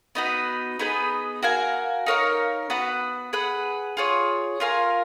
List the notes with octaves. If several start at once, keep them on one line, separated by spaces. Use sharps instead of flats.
B3 D#4 F#4 B4
B3 D#4 G#4 B4
F#4 A#4 F5 G#5
D#4 A#4 C#5 F5
B3 F#4 B4 F#5
G#4 B4 F#5
F4 G#4 C#5
F4 A#4 F5 G#5